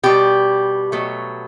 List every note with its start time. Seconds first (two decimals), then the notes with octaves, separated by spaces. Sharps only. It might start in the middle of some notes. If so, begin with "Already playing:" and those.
0.03 B2 G3 G4
0.92 B2 F#3 A3